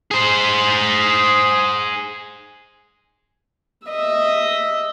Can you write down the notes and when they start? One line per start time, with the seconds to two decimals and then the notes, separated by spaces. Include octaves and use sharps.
0.11 G#4 C5
3.87 D#5 E5